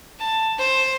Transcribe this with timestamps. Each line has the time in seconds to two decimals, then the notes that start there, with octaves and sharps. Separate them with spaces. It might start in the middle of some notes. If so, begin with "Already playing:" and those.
0.20 A5
0.58 C5